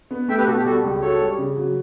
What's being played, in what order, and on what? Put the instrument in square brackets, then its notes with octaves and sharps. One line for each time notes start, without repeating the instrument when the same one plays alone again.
[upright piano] B3
[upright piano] A3 [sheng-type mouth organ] E5 G5
[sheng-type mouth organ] G4 B4
[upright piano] B2 [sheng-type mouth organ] F#4 A4
[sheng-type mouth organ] G4
[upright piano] G3 [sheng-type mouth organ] F#4 A4
[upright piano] C#2
[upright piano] F#4 [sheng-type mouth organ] A4 C#5
[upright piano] G3
C#3
F#3